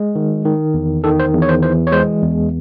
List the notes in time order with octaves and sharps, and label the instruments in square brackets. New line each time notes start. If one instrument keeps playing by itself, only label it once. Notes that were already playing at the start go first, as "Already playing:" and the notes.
Already playing: [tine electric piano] G#3
D#3
D#3
E2
D#3 A4
C5
E2
C#5
C5
E3 C5
C#5
G#3 C5
E2